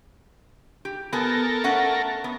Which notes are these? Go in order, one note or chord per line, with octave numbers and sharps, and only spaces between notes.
G4
B3 A4 A#4 G#5
A3 C#4 F#5
B3